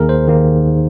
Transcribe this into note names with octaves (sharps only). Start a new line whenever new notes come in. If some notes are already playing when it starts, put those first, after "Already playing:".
Already playing: D#2 D#3 A#3 D#4 G#4 A#4
C5
D#2 D#3 A#3 D#4